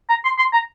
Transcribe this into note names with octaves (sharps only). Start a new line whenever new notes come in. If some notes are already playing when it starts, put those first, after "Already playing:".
A#5
C6
C6
A#5